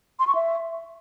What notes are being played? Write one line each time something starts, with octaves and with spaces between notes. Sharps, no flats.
C6
C#6
E5